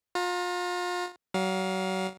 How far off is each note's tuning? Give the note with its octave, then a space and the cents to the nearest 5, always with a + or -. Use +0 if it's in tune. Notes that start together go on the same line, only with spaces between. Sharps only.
F4 +35 A#5 +0
F#3 +35 F5 +20